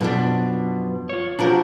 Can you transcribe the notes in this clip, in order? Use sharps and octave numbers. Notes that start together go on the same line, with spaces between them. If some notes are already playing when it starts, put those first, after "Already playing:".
F#2 B2 F3 D4
F4 C#5
F3 F#3 D4 F#4 G4 A#4